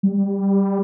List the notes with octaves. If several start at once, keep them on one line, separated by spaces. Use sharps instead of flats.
G3